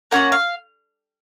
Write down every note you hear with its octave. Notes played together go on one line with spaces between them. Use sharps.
A#3 C#4 F#4 F#5
F5